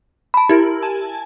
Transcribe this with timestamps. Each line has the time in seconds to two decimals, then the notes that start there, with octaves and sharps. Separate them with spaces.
0.34 A5 B5
0.49 E4 G4 A#4
0.82 G#5 A5 G#6